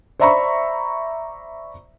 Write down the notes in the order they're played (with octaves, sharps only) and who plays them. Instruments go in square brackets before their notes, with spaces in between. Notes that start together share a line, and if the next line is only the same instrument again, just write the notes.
[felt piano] C5 D5 E5 A#5 B5 C#6